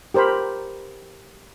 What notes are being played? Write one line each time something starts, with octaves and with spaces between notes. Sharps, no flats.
G4 A#4 C5 A#5 B5